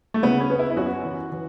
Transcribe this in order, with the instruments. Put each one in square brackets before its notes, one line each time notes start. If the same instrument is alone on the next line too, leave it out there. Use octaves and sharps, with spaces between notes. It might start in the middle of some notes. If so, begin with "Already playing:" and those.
[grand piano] A3
[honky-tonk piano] C#3 [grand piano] B3
[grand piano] C#4
[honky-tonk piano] B3
[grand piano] E4
E4
[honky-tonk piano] F#2 [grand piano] F#4
[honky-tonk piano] E3
E3